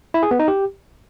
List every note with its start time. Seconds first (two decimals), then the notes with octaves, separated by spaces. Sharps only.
0.14 E4
0.23 G#4
0.31 B3
0.39 D#4
0.48 G4